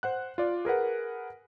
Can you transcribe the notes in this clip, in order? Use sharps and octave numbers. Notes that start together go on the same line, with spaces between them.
C5 F#5 F#6
F4 D5
G#4 A#4 B4 F#5